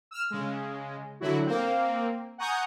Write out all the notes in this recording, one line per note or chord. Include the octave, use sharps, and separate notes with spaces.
E6 F6
C#3 G#3
D3 F#3 E4 F#4
A#3 C4
F#5 G#5 A#5 C#6 D#6 G6